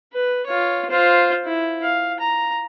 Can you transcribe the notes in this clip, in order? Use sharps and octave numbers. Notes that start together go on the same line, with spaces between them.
B4
F4 C#5
F4 C5
E4
F5
A#5